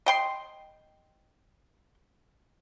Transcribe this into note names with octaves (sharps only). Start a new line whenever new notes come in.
D#5 G5 C6